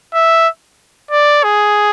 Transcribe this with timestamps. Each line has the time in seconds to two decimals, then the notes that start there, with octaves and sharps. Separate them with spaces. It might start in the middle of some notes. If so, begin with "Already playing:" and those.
0.14 E5
1.11 D5
1.44 G#4